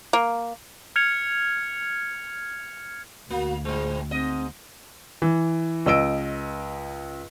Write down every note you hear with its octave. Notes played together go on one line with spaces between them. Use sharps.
A#3
F6 G#6 C#7 F7
D2 A#3 F#4
A2 G#3 C5
G#2 C4 D#5
E3
C#2 D#5 E6 D7